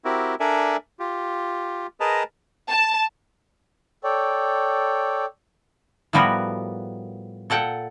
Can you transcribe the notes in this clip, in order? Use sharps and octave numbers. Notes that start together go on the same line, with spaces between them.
C4 E4 F#4 G4 A#4
D4 A4 A#4 D5 E5 G#5
F4 G4
G#4 A#4 B4 D#5 A5 A#5
A5
A4 C#5 D5 G5
A2 F3 G3 B3 F#4 A#4
A#2 A4 F#5 G5